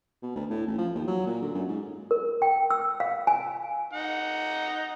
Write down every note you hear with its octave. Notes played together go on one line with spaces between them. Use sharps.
B2
D2
A2
A1
F3
D#2
F#3
A#2
D3
F#2
G#2
A#4
G5
E6
F5
G#5
D#4 F#5